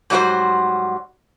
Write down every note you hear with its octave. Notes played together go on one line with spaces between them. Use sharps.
G#2 F#3 G3 D#4 F#4 C5